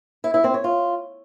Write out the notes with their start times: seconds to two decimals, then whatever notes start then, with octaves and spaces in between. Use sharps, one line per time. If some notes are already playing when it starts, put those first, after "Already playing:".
0.24 E4
0.34 E4
0.44 C4
0.54 C#5
0.64 F4